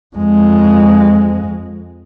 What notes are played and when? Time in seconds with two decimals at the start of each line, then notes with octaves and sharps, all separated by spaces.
0.17 F2 G#3